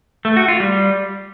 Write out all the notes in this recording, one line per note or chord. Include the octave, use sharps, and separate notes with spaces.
A3
F#4
F4
G3